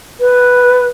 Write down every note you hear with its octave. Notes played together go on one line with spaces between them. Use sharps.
B4